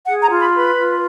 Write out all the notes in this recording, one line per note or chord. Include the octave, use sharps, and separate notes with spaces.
G#4 F#5
A#5
F4
B5
B4 B5
F4